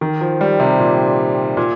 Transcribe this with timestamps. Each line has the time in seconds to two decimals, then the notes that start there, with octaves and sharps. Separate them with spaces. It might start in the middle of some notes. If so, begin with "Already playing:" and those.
0.01 D#3
0.21 F3
0.41 G3
0.60 C3
0.79 A#2
1.57 A#2